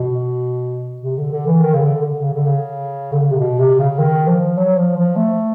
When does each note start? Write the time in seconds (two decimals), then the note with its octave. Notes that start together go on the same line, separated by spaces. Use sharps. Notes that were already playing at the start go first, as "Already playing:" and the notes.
Already playing: B2
1.02 C3
1.18 D3
1.32 D3
1.47 E3
1.61 D#3
1.74 C#3
1.82 D3
2.01 D3
2.21 C#3
2.34 D3
2.46 C#3
3.12 D3
3.22 C#3
3.31 C3
3.39 B2
3.59 C3
3.79 C#3
3.99 D#3
4.27 F3
4.57 F#3
4.77 F3
4.97 F3
5.16 A3